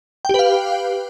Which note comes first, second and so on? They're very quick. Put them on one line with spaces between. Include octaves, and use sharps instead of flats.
G5 G4 B4 F5